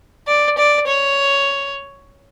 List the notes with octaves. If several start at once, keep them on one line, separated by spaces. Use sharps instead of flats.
D5
D5
C#5